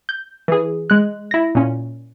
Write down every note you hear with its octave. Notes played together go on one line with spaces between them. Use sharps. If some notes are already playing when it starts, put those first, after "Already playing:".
G6
E3 G#4
G#3 F#6
E4 A#6
A#2 C#4